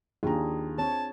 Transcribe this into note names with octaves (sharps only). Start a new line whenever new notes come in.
D#2 D4 F4 G#4 A#5
C4 C#5 A5